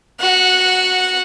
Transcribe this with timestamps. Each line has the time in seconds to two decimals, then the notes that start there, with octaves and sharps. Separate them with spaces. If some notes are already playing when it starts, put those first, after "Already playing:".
0.20 F#4 F#5